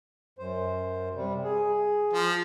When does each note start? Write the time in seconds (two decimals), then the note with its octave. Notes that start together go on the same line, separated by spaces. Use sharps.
0.38 F#2 C5
1.15 C3 G3
1.44 G#4
2.14 F3